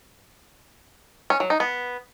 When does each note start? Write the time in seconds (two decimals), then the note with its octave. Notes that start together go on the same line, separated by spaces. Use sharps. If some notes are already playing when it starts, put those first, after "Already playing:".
1.30 C#4
1.40 F#3
1.50 D#4
1.60 B3